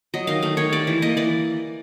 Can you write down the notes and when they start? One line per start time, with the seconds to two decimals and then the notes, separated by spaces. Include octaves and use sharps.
0.14 F#3 D#5
0.27 D#3 F5
0.42 A3 F5
0.57 D#3 C#5
0.72 G3 D5
0.87 E3
1.02 A#3 D#5
1.17 E3 D5